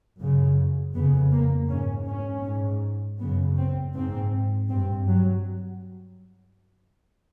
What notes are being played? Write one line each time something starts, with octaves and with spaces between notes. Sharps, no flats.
F#2 C#3
F2 C#3 B3
A#3
G#2 C#4
C#4
G#2
F#2 C#3 B3
C4
G#2 C4
G2 C4
F#3